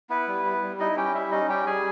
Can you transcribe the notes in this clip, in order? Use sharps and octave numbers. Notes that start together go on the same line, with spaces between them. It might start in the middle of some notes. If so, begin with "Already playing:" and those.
B3 E4 B4
G3
E4
G3
D#4 E4 D#5
C#4 G4 G5
G3 E4 E5
C#4 D#4 D#5
G3 G4 G5
G3 G#4 G#5